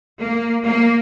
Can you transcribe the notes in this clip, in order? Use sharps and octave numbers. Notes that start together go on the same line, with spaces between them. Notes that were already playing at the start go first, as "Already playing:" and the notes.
A#3
A#3